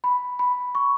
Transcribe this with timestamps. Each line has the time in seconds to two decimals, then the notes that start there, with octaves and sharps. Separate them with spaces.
0.04 B5
0.39 B5
0.75 C#6